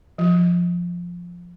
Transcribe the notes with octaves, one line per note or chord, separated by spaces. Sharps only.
F3